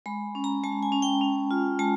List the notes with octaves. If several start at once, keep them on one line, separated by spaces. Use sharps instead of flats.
G#3 B5
C#4
A#5
G#3 A5
G#5
C#4
G5
C#4
F4
G#3 A5